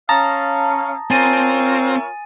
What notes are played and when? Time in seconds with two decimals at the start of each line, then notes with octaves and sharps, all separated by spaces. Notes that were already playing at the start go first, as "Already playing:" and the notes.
0.09 C#4 F5 A5 A#5 D#6
1.11 C4 F4 A#4 C#5 G#5 A6 D#7